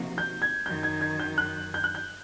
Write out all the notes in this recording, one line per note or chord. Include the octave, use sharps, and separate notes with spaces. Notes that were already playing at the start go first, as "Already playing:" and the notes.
Already playing: C3 F3 A#3 D#4 F#4
G6
G#6
F#2 D#3 F#3 G6
G#6
G#6
G6
F#6
G6
F#6
G6